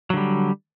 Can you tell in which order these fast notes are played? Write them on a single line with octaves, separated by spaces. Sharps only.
F#3 D3 G3